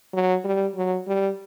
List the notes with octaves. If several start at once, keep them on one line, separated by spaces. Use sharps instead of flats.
F#3
G3
F#3
G3